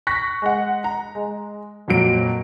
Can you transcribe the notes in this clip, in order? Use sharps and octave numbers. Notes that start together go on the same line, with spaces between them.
C#6 F#6 A#6 B6
G#3 F#5
A#5
G#3
F2 A#2 F#3 D7